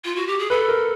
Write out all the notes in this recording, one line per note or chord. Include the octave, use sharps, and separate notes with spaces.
F4
F#4
G4
G#4
A4 B4
A#4